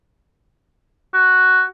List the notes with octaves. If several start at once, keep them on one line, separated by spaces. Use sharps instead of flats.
F#4